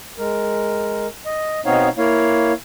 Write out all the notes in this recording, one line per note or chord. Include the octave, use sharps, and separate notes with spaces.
G#3 A#4
D#5
B2 B3 C4 D#4 C#5 F5
A#3 E4 C#5 F5